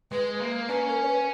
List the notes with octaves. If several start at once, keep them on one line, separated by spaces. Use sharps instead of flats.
G#3 B4
A#3
C#4 B4
A#4
C#5
B4